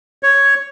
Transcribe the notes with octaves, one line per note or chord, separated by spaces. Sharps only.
C#5